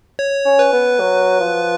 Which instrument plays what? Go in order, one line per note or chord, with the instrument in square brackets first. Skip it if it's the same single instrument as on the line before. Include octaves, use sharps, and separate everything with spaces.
[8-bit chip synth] C#5
[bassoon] C#4
[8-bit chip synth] B4
[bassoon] B3
F#3
F3